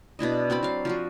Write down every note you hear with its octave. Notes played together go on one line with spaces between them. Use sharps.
B2 D4 E4 D#5
C4 F#4 D5 B5
F#3 F5
F3 F4 F#4